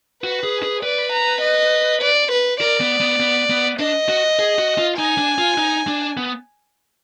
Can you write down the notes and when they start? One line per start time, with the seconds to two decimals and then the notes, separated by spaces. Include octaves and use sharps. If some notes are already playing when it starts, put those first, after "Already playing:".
0.23 F#4 B4
0.43 G#4
0.63 G#4
0.83 B4 D5
1.13 A#5
1.42 D#5
2.02 D5
2.32 B4
2.61 A#4 D5
2.81 B3
3.01 B3
3.20 B3
3.50 B3
3.79 D4 D#5
4.09 F#4
4.39 G#4
4.59 F#4
4.78 F4
4.98 D#4 G#5
5.18 D4
5.38 F4
5.58 D#4
5.88 D4
6.17 B3